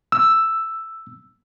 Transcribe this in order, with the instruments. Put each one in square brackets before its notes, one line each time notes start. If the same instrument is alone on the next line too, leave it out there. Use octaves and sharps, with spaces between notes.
[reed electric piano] E6